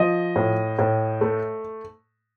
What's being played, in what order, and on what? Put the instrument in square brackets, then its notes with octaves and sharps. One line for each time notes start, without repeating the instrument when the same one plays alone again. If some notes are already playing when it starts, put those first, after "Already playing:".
Already playing: [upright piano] F3 D#5
A2
A2
A3